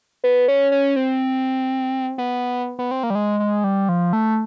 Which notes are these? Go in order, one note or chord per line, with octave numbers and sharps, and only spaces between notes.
B3
C#4
C#4
C4
B3
B3
C4
A#3
G3
G#3
G#3
G3
F3
A3